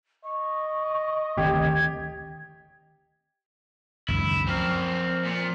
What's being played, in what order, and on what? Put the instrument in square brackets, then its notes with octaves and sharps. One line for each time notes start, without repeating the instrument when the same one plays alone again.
[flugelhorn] D#5 [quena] C#6
[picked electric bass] D2 D#3 C4 [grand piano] G4 [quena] G#6
[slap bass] C#2 F#2 D#3 [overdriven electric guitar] E4
[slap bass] F3 [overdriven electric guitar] C4 A#4
[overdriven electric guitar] A#2